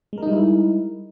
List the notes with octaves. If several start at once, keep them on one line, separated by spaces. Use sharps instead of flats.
G3 G#3 D#4 E4 A#4